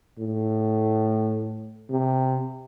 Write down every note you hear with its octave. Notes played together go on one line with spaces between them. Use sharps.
A2
C3